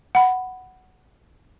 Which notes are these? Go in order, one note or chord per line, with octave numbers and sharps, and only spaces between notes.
F#5 B5